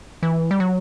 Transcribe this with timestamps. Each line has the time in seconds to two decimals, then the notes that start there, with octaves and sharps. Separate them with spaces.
0.23 E3
0.51 G3
0.60 F#3